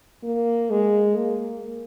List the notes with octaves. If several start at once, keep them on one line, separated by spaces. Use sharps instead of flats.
A#3
G#3
A#3